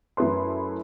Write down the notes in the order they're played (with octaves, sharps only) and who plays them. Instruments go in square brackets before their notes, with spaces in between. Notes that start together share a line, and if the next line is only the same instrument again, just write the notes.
[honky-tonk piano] F#2 A3 E4 A4 B4 C6